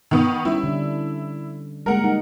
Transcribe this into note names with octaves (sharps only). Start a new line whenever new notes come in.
D#3 B3 D#6
G3 C#4 E4
D3 D4
G3 G#3 A#3 A#4 F#5
D#4